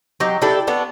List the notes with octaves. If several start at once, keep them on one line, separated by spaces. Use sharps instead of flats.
F#3 D#4 G4
D4 E4 G4 A4
A3 B3 D4